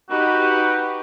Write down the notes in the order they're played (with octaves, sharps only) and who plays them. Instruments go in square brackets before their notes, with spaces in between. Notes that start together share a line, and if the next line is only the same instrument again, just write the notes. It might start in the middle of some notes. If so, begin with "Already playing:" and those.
[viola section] D#4 G4 B4 [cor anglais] F#4